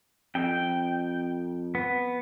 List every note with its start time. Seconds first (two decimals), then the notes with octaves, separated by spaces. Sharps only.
0.35 F2 G5
1.75 B3